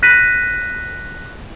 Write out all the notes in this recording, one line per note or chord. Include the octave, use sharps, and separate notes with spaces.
F#6 A#6 B6 D#7